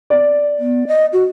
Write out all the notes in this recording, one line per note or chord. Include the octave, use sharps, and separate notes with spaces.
D5
B3
D#5
F#4